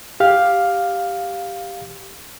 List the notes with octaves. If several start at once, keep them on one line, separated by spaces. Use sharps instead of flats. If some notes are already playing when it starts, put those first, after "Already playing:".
G4 F5